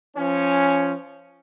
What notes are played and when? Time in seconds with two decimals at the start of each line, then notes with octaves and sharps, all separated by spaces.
0.16 F3 C#4